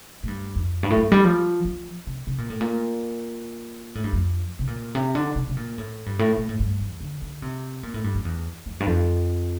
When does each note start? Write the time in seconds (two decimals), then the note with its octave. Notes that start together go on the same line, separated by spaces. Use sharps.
0.23 A2
0.28 G2
0.56 F2
0.83 G2
0.90 A2
0.97 G2
1.12 G3
1.24 F3
1.65 F3
2.07 C3
2.27 C3
2.38 A#2
2.50 A2
2.61 A#2
3.95 A2
4.04 G2
4.13 F2
4.59 C3
4.67 A#2
4.95 C3
5.15 D3
5.36 C3
5.49 C3
5.57 A#2
5.78 A2
6.06 G2
6.19 A2
6.37 A#2
6.49 A2
6.60 G2
6.81 E2
7.01 D3
7.22 D3
7.42 C3
7.83 A#2
7.94 A2
8.04 G2
8.14 F2
8.25 E2
8.66 F2
8.80 G2
8.87 F2